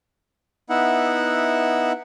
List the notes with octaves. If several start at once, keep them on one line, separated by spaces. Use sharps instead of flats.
B3 D#4 E4 E5 F#5